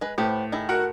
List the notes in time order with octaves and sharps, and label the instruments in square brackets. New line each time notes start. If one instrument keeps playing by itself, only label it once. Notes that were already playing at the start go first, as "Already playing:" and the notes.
[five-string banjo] G#3 B4
[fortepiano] A2 [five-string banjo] B3 G4 C5
[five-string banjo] D#3 E4 G#4
[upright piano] F#4 A#4 F#5